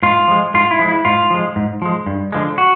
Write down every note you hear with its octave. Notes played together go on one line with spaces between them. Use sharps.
G#2 F4
F3 G#3
G#2 F4
E4
F3 G#3
E4
G#2 F4
F3 G#3
G#2
F3 G#3
G2
D3 F3 G#3
F#4